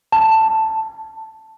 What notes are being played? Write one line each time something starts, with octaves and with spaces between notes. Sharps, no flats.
A5